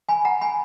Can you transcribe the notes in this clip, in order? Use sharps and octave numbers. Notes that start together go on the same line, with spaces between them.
G#5 B5
F#5 A#5
G#5 B5